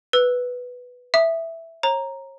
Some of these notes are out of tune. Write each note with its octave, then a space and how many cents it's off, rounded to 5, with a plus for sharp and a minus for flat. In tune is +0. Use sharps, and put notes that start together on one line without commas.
B4 +0 E6 +0
E5 +0 D#6 -20
C#5 -35 A#5 +0